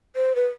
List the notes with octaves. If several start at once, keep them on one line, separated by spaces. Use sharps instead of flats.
C5
B4